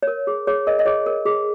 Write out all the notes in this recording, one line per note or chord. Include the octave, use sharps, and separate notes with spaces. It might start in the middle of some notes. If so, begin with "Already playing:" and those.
C#5
A#4
G#4
G#4 C#5
A#4 D#5
D#5
G#4 C#5
A#4
G#4